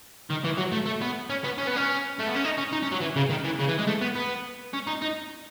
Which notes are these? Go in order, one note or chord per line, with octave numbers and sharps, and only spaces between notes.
D#3
E3
F#3
A3
A3
B3
C#4
B3
C#4
B3
C#4
A3
B3
C#4
D#4
C#4
D#4
C#4
F#3
E3
C#3
D#3
E3
C#3
E3
G#3
A3
B3
B3
C#4
D#4
D#4